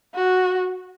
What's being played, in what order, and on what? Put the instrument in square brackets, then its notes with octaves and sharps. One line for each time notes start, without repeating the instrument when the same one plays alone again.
[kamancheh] F#4